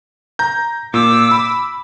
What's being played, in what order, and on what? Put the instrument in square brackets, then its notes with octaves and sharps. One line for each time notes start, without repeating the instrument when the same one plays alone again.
[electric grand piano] A#5 G6
[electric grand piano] A#2 [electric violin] D6 E6
[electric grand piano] B5